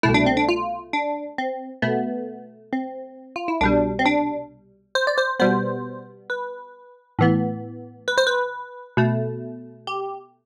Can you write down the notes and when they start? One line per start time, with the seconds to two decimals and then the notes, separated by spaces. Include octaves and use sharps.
0.03 C2 B2 A3 E4
0.14 D4
0.26 C4
0.37 D4
0.49 F4
0.93 D4
1.38 C4
1.82 B2 A3 B3
2.73 C4
3.36 F4
3.48 E4
3.61 C2 B2 G3 D4
3.99 C4
4.06 D4
4.95 C5
5.07 D5
5.18 C5
5.40 B2 G3 B3 C5
6.30 B4
7.19 A2 E3 B3
8.08 B4
8.18 C5
8.27 B4
8.97 B2 A3
9.87 G4